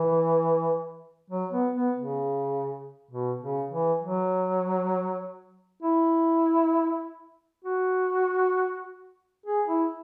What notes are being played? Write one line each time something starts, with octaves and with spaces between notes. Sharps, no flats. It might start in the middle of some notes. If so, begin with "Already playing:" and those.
Already playing: E3
F#3
B3
B3
C#3
B2
C#3
E3
F#3
E4
F#4
G#4
E4